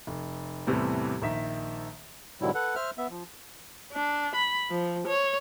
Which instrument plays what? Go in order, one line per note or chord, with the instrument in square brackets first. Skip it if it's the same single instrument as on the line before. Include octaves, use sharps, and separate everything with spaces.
[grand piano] F1
E2 A2 C3 E3 G3 A3
A#1 D#3 E5 A#5 B6
[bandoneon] G#2 B2 D3 F#3 G3 E4
A4 B4 F#5
C5 E5 F6
B3 E5
F3
[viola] D4
B5
F3
C#5